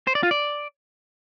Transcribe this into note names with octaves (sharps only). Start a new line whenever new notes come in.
C5
D5
F4
D5